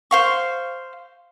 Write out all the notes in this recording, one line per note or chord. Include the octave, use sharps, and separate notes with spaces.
C5 F5 C#6